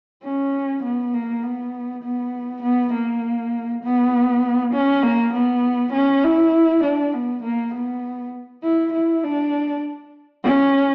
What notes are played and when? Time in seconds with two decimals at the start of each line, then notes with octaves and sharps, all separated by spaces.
0.24 C#4
0.83 B3
1.13 A#3
1.43 B3
2.04 B3
2.63 B3
2.93 A#3
3.83 B3
4.74 C#4
5.03 A#3
5.33 B3
5.93 C#4
6.24 E4
6.84 D4
7.14 B3
7.43 A#3
7.74 B3
8.63 E4
8.93 E4
9.23 D4
10.44 C#4